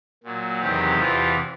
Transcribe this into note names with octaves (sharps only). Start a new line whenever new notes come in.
A#2 F#3
E2 C3 D#3 F#3 G4
E2 C3 E3 F4